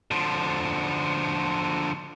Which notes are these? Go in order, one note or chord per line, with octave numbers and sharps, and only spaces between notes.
D3 F3